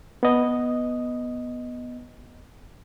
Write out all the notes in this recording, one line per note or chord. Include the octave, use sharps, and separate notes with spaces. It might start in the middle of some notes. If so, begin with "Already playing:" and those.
B3 D#5